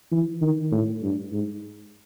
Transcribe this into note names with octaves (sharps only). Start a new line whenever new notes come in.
E3
D#3
A2
G2
G#2